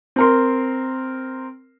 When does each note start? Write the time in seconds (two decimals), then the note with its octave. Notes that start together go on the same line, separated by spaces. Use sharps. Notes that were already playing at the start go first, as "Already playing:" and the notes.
0.16 C4 A#4 C6